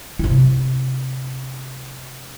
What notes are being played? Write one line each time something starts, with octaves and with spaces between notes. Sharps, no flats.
C3 E4